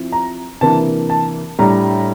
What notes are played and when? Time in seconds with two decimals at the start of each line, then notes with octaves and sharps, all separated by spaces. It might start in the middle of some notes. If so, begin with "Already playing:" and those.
Already playing: F3 C4 E4
0.12 A#5
0.61 C3 E3 A#3 D4 A5
1.10 A5
1.59 A2 G3 D4 A#5